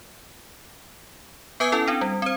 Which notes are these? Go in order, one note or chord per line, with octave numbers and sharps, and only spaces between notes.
B3 B4 G#5 D#6 G#6
C#4 E4 A4
C4 D4
G3
C4 C5